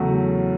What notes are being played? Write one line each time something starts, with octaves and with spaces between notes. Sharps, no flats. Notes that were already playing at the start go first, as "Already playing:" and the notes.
Already playing: E2 C#3 F#3 A3